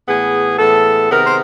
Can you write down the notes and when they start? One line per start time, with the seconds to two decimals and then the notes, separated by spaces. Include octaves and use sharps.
0.07 A2 E3 G#3 B3 G#4
0.59 A2 E3 G#3 B3 A4
1.10 C3 D#3 G#3 B3 A#4
1.25 C5